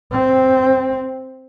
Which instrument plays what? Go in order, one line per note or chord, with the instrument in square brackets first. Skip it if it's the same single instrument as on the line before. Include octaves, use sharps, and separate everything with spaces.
[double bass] C4